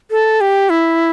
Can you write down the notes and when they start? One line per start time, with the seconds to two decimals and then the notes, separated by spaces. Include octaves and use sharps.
0.11 A4
0.41 G4
0.70 E4